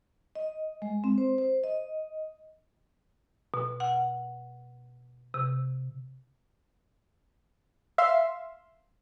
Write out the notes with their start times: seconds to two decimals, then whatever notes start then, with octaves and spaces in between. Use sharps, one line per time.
0.35 D#5
0.82 G#3
1.04 C4
1.18 C5
1.38 C5
1.64 D#5
3.54 B2
3.80 F#5
5.34 C3
7.98 E5 F5 C6